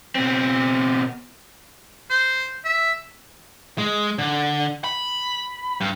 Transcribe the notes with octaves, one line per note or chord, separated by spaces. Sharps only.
B2 C4
C5
E5
G#3
D3
B5
G2